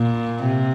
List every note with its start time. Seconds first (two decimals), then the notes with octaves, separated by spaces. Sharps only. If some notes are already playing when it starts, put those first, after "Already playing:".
Already playing: A#2
0.43 C3